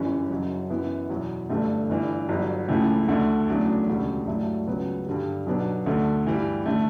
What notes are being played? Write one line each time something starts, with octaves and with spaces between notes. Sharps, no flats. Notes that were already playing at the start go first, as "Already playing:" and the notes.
Already playing: G1 F#2 E3 G3 C#4
F#1 F#2 C#3 F#3
F#2 E3 B3 E4
E2 B2 F#3
G1 G2 D3 A3
G1 G2 E3
G1 G2 F#3
C#2 C#3 E3 A3
D2 D3 A3
E2 C#3 F#3 A3 D4
E1 D2 C#3 G3
G2 F#3 A3 E4
C#2 C#3 F#3 B3
G2 D3 G3
B1 B2 F#3 B3 D4
D2 D3 A3
G2 E3 G3
D3 A3